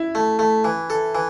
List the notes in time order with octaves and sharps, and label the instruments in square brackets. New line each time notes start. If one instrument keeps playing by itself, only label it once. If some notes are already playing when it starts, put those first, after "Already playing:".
Already playing: [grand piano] E4
[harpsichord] A3
A3
E3
A4
E3